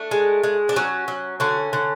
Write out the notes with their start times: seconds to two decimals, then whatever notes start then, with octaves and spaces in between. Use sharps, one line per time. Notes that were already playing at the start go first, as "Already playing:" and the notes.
Already playing: A3 D4
0.11 G#3
0.44 G#3
0.69 D4
0.76 F#3 C#4
1.08 F#3
1.40 D3 C#4
1.73 D3